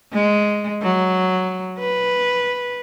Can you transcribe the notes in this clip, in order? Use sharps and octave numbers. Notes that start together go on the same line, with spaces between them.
G#3
F#3
B4